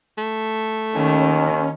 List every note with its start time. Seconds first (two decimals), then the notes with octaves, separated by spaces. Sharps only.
0.18 A3
0.95 D#2 D#3 C#4